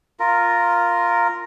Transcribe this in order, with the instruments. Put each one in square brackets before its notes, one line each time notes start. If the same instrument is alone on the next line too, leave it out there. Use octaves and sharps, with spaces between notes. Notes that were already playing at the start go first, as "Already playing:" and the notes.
[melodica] F4 A#4